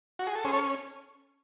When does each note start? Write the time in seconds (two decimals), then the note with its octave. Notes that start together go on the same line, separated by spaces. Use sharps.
0.19 F#4
0.27 G#4
0.36 A4
0.44 C#4 G#4 C5
0.53 A4 C#5